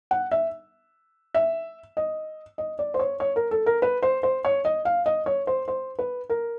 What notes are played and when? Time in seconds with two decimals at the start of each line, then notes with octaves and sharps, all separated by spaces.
0.11 F#5
0.32 E5
1.34 E5
1.97 D#5
2.58 D#5
2.79 D5
2.94 C5
2.99 C#5
3.20 C#5
3.36 A#4
3.51 A4
3.66 A#4
3.82 B4
4.02 C5
4.23 C5
4.45 C#5
4.65 D#5
4.85 F5
5.06 D#5
5.26 C#5
5.47 C5
5.68 C5
5.99 B4
6.29 A#4